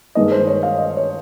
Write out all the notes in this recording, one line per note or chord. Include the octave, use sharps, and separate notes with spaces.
G2 D#3 G#3 D#5
C5
C#5
F5
D#5
C#5